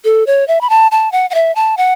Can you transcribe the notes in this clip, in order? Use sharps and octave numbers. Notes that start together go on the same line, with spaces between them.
A4
C#5
E5
B5
A5
A5
F#5
F#5
E5
A5
F#5